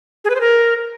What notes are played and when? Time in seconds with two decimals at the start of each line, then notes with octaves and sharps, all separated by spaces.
0.25 G#4
0.30 B4
0.35 C5
0.41 A#4